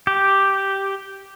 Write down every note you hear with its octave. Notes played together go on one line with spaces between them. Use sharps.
G4